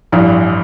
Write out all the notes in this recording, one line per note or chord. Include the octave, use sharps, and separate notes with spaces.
A1 G2 E3 F3 G3